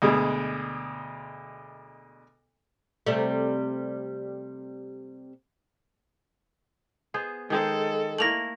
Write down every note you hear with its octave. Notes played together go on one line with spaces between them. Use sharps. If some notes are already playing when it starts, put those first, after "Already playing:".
D2 B2 G#3
C3 G3 A3
B3 G#4 C5
D#3 G#3 G#4 A4 C5
A3 A#3 E4 A#6 F7 F#7